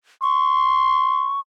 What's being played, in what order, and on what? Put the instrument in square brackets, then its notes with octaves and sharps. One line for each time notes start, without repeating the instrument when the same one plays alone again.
[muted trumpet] C6 [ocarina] C#6